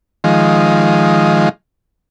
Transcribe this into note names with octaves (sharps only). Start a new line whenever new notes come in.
D#3 F3 G#3